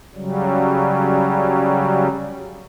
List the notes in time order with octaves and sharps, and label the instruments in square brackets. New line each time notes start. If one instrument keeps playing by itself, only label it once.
[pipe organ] C#3 F#3 G3